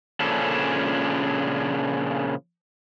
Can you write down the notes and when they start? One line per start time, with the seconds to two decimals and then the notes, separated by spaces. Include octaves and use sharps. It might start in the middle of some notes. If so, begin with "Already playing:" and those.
0.20 A#2 C#3 F3 C#4 D4 A4